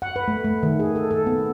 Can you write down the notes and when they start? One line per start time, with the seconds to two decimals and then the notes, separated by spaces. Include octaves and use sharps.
0.02 F#5
0.16 B4
0.28 A3
0.44 A3
0.63 D#3
0.80 G#4
0.96 A4
1.11 A4
1.26 B3